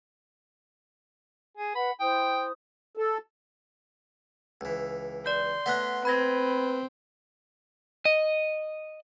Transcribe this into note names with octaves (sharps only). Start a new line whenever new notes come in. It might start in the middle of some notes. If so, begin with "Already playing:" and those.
G#4
B4 F#5 B5
E4 C5 G5 D#6
A4
C#2 E3
D5 C6 G6
A3 B3 C#5 F#5 F#6
C4 B4 B5 G#6 A#6
D#5